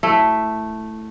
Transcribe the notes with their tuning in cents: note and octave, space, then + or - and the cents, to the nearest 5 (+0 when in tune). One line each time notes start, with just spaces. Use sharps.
A3 +0 E4 +0